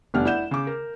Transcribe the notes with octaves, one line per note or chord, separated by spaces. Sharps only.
F1 E2 G3 D4 F#5 F6
E4 D5 F#5 G6 E7
C#3 D6
A#4